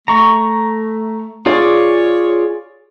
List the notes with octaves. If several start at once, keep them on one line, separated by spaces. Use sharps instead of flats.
A3 A#5 C#6
F4 G#4 C#5 D5